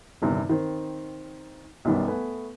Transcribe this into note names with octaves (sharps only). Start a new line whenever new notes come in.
G1 E2 G2 C3 D#3
D#3 C4
B1 F#2 D#3 G3 B3
A3 B3 B4 G#5